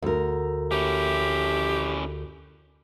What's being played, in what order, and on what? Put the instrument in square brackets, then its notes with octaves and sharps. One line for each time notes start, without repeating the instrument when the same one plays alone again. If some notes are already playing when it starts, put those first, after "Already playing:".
[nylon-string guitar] D2 A#4
[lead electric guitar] C#4 E4 [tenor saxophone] G4